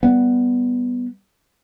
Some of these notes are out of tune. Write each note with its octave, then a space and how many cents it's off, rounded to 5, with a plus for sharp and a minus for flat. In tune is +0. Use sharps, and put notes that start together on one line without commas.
G3 +0 B3 +0